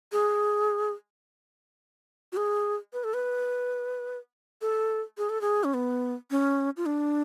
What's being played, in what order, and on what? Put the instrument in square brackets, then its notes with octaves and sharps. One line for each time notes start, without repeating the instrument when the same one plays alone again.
[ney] G#4
F#4
G#4
B4
A4
B4
A4
G#4
A4
G#4
C#4
B3
C#4
F4
D4